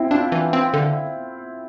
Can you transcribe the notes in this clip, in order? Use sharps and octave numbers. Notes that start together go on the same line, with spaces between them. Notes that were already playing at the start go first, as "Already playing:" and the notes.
Already playing: C4 E4
D4 F4
E3
C4
D3